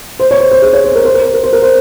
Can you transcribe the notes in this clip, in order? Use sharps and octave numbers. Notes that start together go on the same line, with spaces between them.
C5
C#5
C5
C5
G#4
C#5
C5
A#4
C5
A#4
C5
A#4
C5
A#4
C5